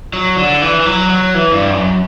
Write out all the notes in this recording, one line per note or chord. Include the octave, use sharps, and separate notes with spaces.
F#3
D3
E3
E3
F#3
F#3
E3
G2
F#2